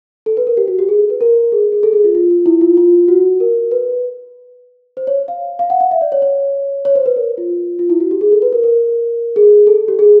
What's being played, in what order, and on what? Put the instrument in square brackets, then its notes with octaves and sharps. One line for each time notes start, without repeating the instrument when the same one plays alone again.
[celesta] A4
B4
A#4
G4
F#4
G4
G#4
A4
B4
A#4
G#4
G#4
A4
G#4
F4
F4
F4
E4
F4
F4
F#4
A#4
B4
C5
C#5
F5
F5
F#5
F5
E5
D5
C#5
C#5
C#5
C5
B4
A#4
F4
F4
E4
F#4
G4
G#4
A4
B4
A#4
A#4
G#4
A4
G4
G#4